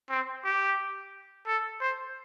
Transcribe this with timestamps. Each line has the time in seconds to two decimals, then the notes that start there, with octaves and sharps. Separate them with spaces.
0.10 C4
0.45 G4
1.47 A4
1.81 C5